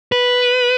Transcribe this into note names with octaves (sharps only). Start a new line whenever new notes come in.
B4